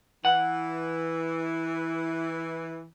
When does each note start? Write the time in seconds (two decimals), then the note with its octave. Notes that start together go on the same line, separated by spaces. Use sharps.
0.25 E3 F#5